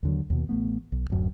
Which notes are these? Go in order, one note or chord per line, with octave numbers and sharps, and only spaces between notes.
D#2 D3 F#3
D#2 B2
A1 A3 B3
B1
D1 F#2